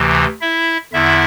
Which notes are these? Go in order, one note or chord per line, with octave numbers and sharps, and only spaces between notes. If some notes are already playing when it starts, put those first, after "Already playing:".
Already playing: D2 C3 E3
E4 E5
E2 D3 E4 E5